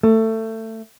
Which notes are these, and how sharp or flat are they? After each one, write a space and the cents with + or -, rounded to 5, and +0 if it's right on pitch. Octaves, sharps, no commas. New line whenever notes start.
A3 +20